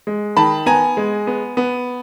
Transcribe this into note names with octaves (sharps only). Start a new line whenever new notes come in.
G#3
D#3 A5 B5
B3 G#5 A#5
G#3
B3
B3